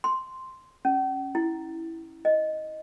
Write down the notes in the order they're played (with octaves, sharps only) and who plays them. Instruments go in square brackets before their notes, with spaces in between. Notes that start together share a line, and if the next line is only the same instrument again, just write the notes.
[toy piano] C6
C#4
E4
D#5